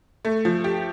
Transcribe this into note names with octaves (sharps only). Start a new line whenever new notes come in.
A3
F3
G4